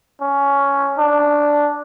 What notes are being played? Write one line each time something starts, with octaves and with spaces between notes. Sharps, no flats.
C#4
D4